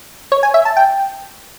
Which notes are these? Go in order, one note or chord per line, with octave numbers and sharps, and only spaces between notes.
C#5
G#5
E5
A5
G5